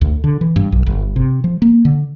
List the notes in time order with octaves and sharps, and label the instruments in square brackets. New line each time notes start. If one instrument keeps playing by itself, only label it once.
[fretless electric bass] D2
D3
E3
G2
B1
G1
C3
F3
A#3
D3